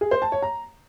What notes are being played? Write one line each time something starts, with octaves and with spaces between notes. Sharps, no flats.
G#4
C5
A5
C#5
A#5